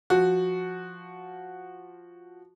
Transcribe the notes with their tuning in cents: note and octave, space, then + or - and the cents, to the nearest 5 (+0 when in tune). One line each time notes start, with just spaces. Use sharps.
F3 +0 F#4 -5